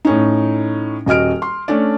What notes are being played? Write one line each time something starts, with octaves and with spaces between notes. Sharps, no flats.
A2 C#4 D#4
D#1 F#4 D#5 F6 D7
C6
A3 C#4 D4 D5